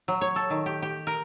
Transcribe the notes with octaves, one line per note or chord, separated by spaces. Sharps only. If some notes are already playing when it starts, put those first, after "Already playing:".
F#3
C#5
A4
D#3
G4
G4
A#4